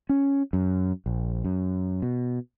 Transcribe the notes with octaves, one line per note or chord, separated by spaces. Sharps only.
C#4
F#2
A#1
F#2
B2